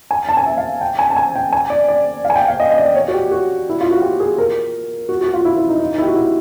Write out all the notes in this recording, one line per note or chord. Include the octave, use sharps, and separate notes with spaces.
G#5
A5
G#5
E5
F5
G5
G#5
A5
G#5
G5
G#5
D5
D5
F5
G#5
G5
F5
D#5
D#5
D5
C#5
F#4
G4
F#4
E4
F4
F#4
G4
G#4
A#4
F#4
F#4
F4
E4
E4
D#4
D#4
D#4
E4
G4
F#4
E4